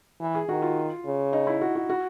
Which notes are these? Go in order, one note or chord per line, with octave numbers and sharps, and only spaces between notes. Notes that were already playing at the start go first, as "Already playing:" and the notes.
E3
G#4
D#3 F#4
F4
C#3
D#4
E4
F#4
F#4
F#4